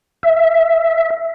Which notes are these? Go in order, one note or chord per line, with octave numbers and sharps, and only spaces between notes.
E5